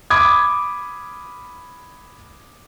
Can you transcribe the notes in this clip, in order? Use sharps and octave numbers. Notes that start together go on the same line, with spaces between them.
B5 D6 D#6 G#6